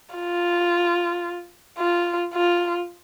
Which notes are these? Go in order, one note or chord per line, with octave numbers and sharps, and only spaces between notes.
F4
F4
F4